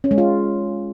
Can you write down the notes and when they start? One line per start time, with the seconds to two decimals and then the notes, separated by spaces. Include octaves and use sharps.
0.04 C#4
0.11 G#3
0.18 F4